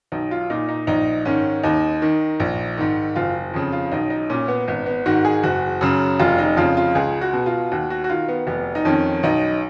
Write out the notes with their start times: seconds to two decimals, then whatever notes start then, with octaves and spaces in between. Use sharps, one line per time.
0.12 B1 D#4
0.31 F4
0.50 A#2 D#4
0.69 D#4
0.87 A#1 D#4
1.25 G#2 D#3 C#4
1.63 D#2 D#4
2.02 D#3
2.40 A#1
2.77 G#2 D#3
3.16 F#1 F4
3.54 F2 C#3
3.72 F4
3.92 B1 D#4
4.10 D#4
4.30 A#2 C#4
4.48 B3
4.68 G#1 B3
4.86 B3
5.06 G#2 D#3 F#4
5.25 G#4
5.43 F#1 F#4
5.81 F#2 C#3
6.20 F1 F4
6.38 D#4
6.57 F2 C#3 F4
6.77 F4
6.95 C#2 G#4
7.21 F#4
7.33 B2
7.46 F4
7.71 D#2 F#4
7.90 F#4
8.04 F#4
8.09 D#3 F4
8.28 B3
8.47 F1 B3
8.75 D#4
8.85 F2 D#3 C#4
9.23 B1 D#4